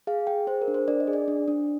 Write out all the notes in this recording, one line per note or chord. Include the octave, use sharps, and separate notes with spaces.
G#4 F5
G#4 G5
G#4 C5
A#4
D4
C5
D4 D5
D#5
G#4
D5
D4
D4